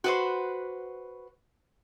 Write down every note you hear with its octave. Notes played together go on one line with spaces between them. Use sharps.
F#4 B4 C5